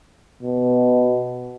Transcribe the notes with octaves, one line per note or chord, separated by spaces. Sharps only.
B2